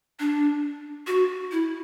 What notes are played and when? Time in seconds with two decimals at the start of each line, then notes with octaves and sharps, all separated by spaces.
0.19 D4
1.07 F#4
1.51 E4